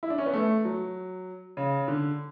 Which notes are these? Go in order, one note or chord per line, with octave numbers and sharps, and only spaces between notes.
E4
D4
C#4
B3
A3
F#3
C#3
D3